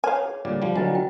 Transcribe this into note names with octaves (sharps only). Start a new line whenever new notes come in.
B4 C#5 F5 G#5
G#4
A#2 D3 G3 D6
F3 G3
D3 F#3 B4 D#5 G#5
F4 F#4 G5